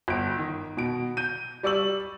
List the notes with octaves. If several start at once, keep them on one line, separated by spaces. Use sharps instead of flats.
G1 D7
D#3
B2 D7
G6 D#7
G3 D5 C#6 E6 F#7